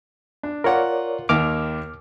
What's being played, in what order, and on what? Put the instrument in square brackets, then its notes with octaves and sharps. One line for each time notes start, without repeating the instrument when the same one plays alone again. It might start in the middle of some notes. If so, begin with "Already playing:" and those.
[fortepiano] D4
[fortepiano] F4 F#5 [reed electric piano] A#4 C#5 D5
[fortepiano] D#2 D#3 A#4 [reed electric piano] D6 F6